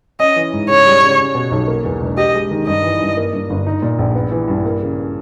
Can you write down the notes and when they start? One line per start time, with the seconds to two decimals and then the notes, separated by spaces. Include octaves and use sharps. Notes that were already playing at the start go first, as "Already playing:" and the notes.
0.20 C#4 D#5
0.36 E3
0.53 G#2
0.69 C#3 C#5
0.86 G3
1.03 C#3
1.19 C#4
1.35 B2
1.51 B1
1.68 A#3
1.85 E2
2.01 E1
2.17 G4 D#5
2.35 G#3
2.51 D#3
2.67 G2 D#5
2.84 E3
3.00 G2
3.17 A#3
3.33 G2
3.50 G1
3.66 D#4
3.82 A#2
3.99 A#1
4.15 B3
4.31 E3
4.48 G2
4.65 A#3
4.82 C#3